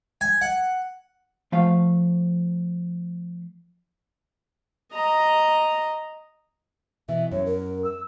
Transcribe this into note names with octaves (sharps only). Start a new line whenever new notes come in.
G#5
F#5
F3 A3 F5
D#5 A#5
B2 E3 E5
F#2 C#5
A#4
E6